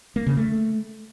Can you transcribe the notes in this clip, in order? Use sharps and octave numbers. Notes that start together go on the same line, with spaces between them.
A#3
C#3
A3